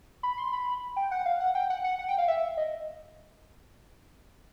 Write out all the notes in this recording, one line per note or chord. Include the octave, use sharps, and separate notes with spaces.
B5
C6
B5
G5
F#5
F5
F#5
G5
F#5
F#5
F#5
G5
F5
E5
D#5